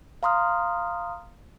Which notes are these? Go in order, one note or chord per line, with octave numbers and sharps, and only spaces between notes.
F5 A#5 C6 D#6 F6